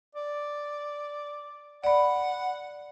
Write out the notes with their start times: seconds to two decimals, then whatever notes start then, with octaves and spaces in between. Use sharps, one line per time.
0.15 D5
1.84 D5 F#5 B5